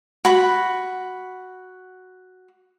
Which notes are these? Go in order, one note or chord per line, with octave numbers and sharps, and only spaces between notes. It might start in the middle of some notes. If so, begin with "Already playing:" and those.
F#4 B5